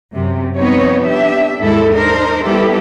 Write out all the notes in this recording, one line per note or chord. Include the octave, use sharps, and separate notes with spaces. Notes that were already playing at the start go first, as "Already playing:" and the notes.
F#2 C3
F3 G3 B3 C4 D#4 C#5
D4 G4 E5
D#2 G#2 G#3 E4 A4
D4 D#4 A#4 C5
G3 B3 E4 G4 A4